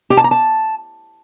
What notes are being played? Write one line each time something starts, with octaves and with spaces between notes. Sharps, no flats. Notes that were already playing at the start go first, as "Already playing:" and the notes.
G4
A5
A#5
A5